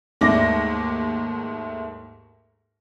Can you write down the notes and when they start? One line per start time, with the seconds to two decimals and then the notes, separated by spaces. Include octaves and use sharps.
0.21 D#2 G#2 A3 D6 A#6